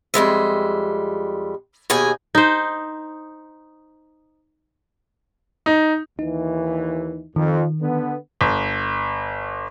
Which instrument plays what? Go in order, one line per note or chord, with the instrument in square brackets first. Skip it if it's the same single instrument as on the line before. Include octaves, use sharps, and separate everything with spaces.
[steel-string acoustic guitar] F2 G3 G#3 E5
D#2 B2 G#4 G5 G#5
[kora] D#4 C5
[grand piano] D#4
[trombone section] D#2 E3 [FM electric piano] D#4
[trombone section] F2 [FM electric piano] D#3
[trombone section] D3 B3
[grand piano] G1